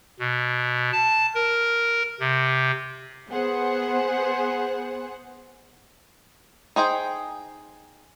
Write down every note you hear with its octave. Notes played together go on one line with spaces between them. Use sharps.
B2
A5
A#4
C3
B3 G#4 C5 F#5
D#4 G#4 C5 G5